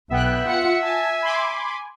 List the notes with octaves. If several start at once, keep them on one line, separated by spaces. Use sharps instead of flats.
B1 B3 E5 G5 F#6
F4 F#5 C#7
G#5 A5
B5 C6 D6